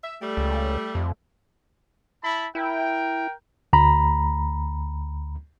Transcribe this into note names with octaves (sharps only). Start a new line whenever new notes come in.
E5
G3 A3
C#2
F2
E4 A5 B5
E4 A#4 G5
D2 A#5 B5